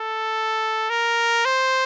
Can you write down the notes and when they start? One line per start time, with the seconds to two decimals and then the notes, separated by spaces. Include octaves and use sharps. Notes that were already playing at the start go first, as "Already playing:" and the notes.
Already playing: A4
0.90 A#4
1.45 C5